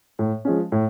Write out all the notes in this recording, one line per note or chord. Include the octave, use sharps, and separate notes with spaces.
A2
F3 G#3 C#4
A2